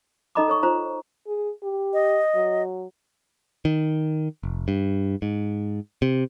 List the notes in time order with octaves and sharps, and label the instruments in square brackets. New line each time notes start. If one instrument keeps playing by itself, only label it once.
[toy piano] D#4 A4 D#5 A#5 B5 D6
A4 C#5 C#6
F4 C5 A#5
[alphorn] G#4
G4
[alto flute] D#5
[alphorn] F#3
[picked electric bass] D#3
F1
G2
G#2
C3